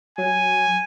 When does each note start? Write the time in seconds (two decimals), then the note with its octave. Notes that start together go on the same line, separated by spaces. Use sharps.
0.18 F#3 G#5